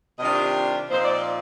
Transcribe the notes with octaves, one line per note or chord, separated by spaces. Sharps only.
C3 D#3 G3 D4 F4 D#5
A#2 F3 C4 D#4 C5
D5
D5